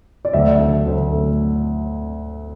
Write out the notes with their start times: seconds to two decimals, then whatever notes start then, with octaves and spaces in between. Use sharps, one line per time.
0.25 D5
0.34 D2 E5
0.59 A3
0.86 D2
1.12 A3